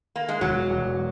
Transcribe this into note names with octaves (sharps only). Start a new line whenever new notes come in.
A#3
G#3
E1 F#3
E1